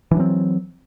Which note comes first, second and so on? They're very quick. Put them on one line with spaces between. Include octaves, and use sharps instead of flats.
E3 D4 F#3 C4